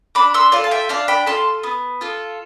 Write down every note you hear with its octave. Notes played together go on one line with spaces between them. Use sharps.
D4 B5 D6
C6 E6
F4 A4 D5 F5
A5
E5 G5
D4 F5 A5
G5 B5
F4 A4 A5 C6
B3
F4 A4